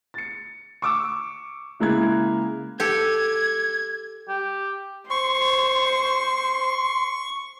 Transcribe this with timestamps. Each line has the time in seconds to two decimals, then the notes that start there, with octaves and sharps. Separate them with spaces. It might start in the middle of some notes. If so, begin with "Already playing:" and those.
0.14 A6 C#7
0.82 C#6 D6 E6
1.80 C#3 G#3 A#3 E4 F#6 G#6
2.80 G4 A4 G#6
4.29 G4
5.10 C5 C6 C#6